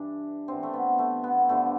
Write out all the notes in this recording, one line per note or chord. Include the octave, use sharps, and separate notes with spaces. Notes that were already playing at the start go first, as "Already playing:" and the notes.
Already playing: G2 E3 D4
G2 E3 C4
A3
B3
A3
B3
G2 D3 F3 A3